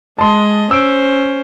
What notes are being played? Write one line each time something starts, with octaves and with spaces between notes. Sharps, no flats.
G#3 D#5 A5 C6
C#4 C5 E6 D7